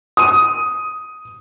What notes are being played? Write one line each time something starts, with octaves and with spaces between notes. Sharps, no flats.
D#6 D#7